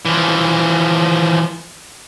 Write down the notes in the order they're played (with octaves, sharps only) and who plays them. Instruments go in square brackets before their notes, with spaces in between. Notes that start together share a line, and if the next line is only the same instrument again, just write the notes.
[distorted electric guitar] E3 F3